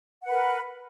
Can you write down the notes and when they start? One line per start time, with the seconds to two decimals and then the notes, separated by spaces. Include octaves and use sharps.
0.23 F#5
0.26 B4
0.30 A#4